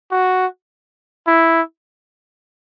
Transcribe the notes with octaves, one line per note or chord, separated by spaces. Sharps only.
F#4
E4